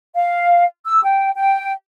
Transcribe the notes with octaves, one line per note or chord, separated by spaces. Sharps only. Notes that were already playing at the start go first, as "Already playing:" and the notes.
F5
E6
G5
G5